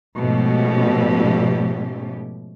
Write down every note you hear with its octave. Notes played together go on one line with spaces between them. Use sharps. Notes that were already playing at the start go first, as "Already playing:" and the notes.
G#2 B2 F3 A3 C#4 G4